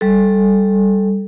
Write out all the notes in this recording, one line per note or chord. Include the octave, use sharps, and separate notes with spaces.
G3 A4